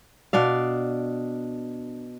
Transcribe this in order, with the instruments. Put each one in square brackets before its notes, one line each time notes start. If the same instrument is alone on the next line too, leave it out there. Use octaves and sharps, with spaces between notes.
[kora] B2 D4 D5 F5